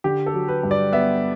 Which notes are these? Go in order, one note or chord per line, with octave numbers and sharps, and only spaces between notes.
D3 G4
A4
F#3
B4
G2
D5
B3 E5